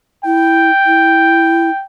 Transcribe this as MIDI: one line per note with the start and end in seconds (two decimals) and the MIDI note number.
0.24 0.70 64
0.24 1.84 79
0.85 1.69 64